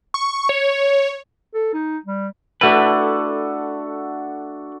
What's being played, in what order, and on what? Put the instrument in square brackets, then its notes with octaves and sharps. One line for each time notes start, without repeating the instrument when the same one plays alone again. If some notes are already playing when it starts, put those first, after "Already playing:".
[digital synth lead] C#6
C#5
[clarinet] A4
D#4
G3
[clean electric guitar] A3 E4 B4 [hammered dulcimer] D4 F#4 A4